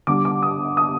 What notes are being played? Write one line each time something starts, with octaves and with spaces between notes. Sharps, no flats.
D3 G3 D6
D6
D#6
D#6